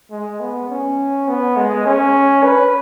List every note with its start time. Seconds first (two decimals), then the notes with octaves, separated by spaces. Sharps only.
0.11 G#3
0.40 B3
0.69 C#4
1.28 B3
1.57 G#3
1.85 C#4
2.44 B4